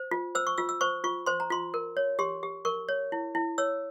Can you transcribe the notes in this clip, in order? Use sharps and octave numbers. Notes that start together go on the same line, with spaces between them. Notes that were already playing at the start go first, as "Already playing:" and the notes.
Already playing: C5
F4
C5 E6
C#6
F4 E6
E6
C5 C#6
F4 C#6
C5 C6
A#5
F4 C6
A#4
C#5
G4 C6
G4
A#4 C#6
C#5
E4
E4
C#5 E6